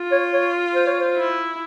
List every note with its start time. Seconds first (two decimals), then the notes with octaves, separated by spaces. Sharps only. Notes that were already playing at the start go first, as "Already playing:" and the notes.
Already playing: F4
0.12 C#5
0.33 C#5
0.75 C5
0.87 C#5
1.00 C5
1.17 E4